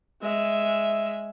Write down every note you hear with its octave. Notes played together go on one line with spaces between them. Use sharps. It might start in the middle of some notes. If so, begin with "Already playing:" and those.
G#3 E5